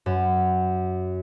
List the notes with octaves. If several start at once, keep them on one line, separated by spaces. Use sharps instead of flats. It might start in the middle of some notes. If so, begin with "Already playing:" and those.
F#2